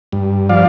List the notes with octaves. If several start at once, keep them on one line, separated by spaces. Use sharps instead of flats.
G2
F3 D5 F5